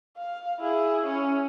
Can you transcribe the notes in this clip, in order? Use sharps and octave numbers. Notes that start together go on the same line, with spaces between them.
F5
E4 G#4
C#4